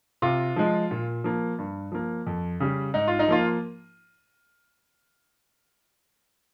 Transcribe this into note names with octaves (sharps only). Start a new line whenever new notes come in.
C3 F4
F3 G#3
A#2
F3 A#3
G2
F3 A#3
F2
C#3 G3
G#2 D#4
F4
D#4
F3 A#3 F4